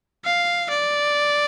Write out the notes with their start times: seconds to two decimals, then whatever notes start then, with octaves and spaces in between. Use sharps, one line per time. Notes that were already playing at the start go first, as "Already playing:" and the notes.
0.25 F5
0.70 D5